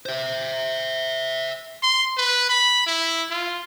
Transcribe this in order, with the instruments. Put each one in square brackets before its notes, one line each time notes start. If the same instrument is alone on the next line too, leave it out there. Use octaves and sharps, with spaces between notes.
[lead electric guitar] C5 E5
[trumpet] C6
B4
B5
E4
F4